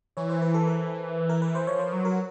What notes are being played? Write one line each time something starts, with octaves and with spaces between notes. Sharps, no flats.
E3 C#5
C5
B4
A4
A#4
A#4
B4
C5
F3 C#5
C5
F#3
A#4